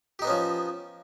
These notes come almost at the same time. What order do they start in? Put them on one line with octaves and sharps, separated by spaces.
G4 D#4 B3 C#4 F3